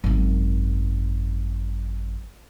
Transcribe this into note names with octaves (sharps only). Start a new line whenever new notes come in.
G#1 F#2